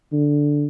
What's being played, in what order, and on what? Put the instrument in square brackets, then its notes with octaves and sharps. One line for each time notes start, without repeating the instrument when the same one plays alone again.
[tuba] D3